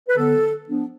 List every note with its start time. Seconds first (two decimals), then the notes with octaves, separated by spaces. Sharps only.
0.09 B4
0.17 D3 F#3 B3 A4
0.67 F3 B3 D4